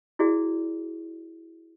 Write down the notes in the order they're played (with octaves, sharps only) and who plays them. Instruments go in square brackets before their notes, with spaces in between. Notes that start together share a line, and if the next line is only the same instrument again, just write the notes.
[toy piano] E4 F#4 G#4 D5